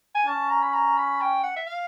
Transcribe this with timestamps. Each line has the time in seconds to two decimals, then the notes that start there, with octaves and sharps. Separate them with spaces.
0.15 G#5
0.26 C#4 A5
0.50 A#5
0.62 B5
0.74 A#5
0.97 B5
1.21 G5
1.43 F#5
1.56 E5
1.67 F5